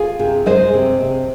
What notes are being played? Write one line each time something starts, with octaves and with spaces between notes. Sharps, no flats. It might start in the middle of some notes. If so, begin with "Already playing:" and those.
Already playing: F4 G#4
C3
G#3 C5 D#5
C3
C3